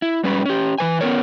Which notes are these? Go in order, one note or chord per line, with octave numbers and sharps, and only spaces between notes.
E4
G#2 G3 C#4 B4
C#4 G4
E3 B4 G#5
B3 C#4 A#4 C#5